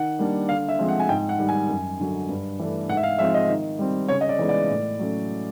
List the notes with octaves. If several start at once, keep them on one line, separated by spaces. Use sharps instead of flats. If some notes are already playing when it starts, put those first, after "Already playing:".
Already playing: D#3 F#5
G3 A#3 D4
D3 F5
E5
F3 G#3 C4
F#5
G#5
G#2 G5
F#5
D#3 G3
G#5
F#2
D3 F#3
G2
E3 A3 D4
G#2 F#5
E5
F5
F3 G#3 C4 D#4 E5
D#5
D#3
G3 C4
C#3 C#5
D#5
D5
E3 G#3 B3 D#4
D5
A2
F#3 A3 C#4